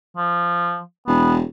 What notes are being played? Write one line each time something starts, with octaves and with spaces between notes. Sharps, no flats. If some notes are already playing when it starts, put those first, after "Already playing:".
F3
E1 B3